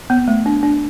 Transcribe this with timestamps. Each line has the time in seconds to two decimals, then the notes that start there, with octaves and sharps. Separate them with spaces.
0.10 B3
0.28 A3
0.46 D4
0.63 D4